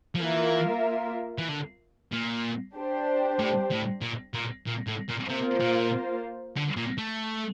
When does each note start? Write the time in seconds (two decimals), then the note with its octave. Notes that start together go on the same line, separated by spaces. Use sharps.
0.15 F3
0.21 E3 A#3 F4 A#4 E5
1.38 E3
1.49 D3
2.12 A#2
2.76 D4 G4 C5
3.39 A2
3.71 A2
4.02 A#2
4.34 A#2
4.66 A#2
4.87 A2
5.09 A#2
5.29 C3 A#3 F4 C5
5.60 A#2
6.57 D3
6.77 A#2
6.98 A3